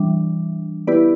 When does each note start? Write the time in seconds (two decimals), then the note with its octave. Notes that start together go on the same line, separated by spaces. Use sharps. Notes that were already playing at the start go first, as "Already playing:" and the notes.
Already playing: E3 G3 D4
0.87 B3 E4 G4 B4 D5